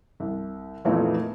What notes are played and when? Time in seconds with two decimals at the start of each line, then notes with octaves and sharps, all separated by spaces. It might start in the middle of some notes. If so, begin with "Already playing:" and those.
0.20 C2
0.85 F2 A#2 E3 A3 B3 D#4